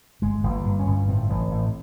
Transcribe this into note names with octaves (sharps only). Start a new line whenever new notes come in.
G1 G#3
G1
A#3
G2
C#4
G1
A2 C4
A1
A2